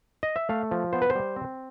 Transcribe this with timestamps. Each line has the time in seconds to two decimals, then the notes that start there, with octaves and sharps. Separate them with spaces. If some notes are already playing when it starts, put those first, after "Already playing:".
0.23 D#5
0.36 E5
0.49 A3 F5
0.71 F3
0.93 B3 C5
1.02 B4
1.10 C5
1.15 G3
1.36 C4